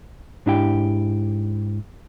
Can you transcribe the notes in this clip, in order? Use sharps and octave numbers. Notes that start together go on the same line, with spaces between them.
G#2 D4 E4 G4 G5